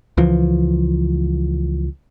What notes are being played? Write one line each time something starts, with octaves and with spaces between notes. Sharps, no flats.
C#2 E3 F3